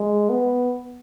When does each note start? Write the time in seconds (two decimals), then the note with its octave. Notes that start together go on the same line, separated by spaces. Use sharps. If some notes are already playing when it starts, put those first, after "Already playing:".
Already playing: G#3
0.29 B3